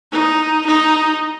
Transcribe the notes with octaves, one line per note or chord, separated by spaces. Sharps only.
D#4
D#4